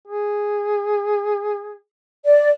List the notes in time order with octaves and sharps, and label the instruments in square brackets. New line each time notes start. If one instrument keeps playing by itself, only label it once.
[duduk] G#4
[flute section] D5